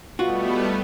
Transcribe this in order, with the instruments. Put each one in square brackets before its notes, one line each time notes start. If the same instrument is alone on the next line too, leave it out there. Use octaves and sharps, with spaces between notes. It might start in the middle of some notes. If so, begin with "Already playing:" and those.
[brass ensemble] B2 [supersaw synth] G3 A3 B3 [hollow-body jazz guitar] F4 F#4